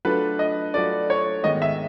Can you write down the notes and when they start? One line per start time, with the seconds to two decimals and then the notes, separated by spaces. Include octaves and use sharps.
0.05 F#3 A3 D4 F4 A4 B4
0.39 D#5
0.74 F#3 A3 D4 F4 A4 D5
1.10 C#5
1.44 G#2 D#3 G#3 B3 D#5
1.62 E5